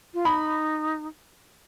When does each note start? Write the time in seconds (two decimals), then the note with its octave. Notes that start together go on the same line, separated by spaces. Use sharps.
0.14 F4
0.25 D#4 B5